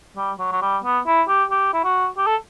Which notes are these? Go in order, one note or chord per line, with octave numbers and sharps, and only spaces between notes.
G3
F#3
F#3
G3
B3
E4
G4
G4
E4
F#4
G4
A4